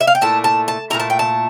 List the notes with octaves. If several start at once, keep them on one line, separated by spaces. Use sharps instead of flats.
E5
F5
G5
A#2 A3 E4 A5
A5
A5
A#2 A3 E4 A#5
A5
G5
A5